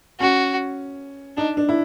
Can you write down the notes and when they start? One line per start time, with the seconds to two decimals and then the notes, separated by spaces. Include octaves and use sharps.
0.20 C#4 F#4
1.37 D4 D#4
1.57 D4
1.69 E4